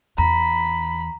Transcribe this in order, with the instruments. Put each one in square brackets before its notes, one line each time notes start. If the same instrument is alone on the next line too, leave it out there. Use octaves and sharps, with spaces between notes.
[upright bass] E2 [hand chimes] A#5 [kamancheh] B5